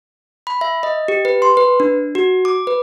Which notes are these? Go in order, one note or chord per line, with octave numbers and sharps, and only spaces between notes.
B5
E5
D#5
G4
B4
C6
B4
D4
F#4
D6
B4